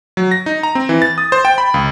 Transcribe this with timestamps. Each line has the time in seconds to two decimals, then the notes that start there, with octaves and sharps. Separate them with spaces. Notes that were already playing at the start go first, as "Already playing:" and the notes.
0.17 F#3
0.31 A#6
0.46 D#4
0.63 A#5
0.75 C4
0.89 E3
1.02 A6
1.18 D#6
1.32 C5
1.45 G5
1.58 B5
1.74 C#2